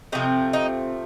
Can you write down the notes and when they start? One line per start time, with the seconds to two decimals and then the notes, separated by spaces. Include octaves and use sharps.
0.12 C3 F3 A3 C4 D#4
0.53 D#4